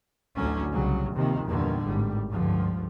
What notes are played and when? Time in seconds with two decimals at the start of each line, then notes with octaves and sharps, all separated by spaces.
0.36 A1 D2 D3 F#3 C#4
0.72 C2 C#3 F#3 G3
1.14 D#2 C3 D#3 F3
1.46 E2 G2 A#2 D3 D#3
1.86 G#1 A2 G3
2.29 C#2 G2 D3 F3